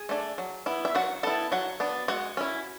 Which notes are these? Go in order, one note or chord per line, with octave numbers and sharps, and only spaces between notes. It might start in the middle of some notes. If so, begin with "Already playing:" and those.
Already playing: G#4 G#5
A3 D4
F#3
B3 E4
E5
F#3 F#4 F#5
B3 E4 A4 A5
F#3 F#4 F#5
B3 D4
G#3 F#4 F#5
C#4 E4